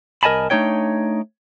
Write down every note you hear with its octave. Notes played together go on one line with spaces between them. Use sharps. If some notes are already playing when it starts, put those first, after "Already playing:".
C2 A#4 D#5 G#5 A5 B5
A3 D4 D#4 C#5 G5